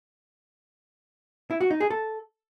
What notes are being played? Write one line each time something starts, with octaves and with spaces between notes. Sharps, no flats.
E4
F#4
D#4
G#4
A4